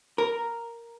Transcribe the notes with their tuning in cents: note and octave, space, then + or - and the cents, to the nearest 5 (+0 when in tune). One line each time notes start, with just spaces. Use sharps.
A#4 +0